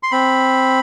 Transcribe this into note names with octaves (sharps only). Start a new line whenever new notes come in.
C6
C4 B5